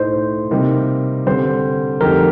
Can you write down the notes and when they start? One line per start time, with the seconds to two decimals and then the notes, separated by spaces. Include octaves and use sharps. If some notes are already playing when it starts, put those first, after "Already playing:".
Already playing: A2 A3 D#4 C5
0.51 C3 G3 A#3 D#4 G4
1.26 D3 G3 C4 G4 C5
2.01 F2 D3 A3 D#4 G4 A#4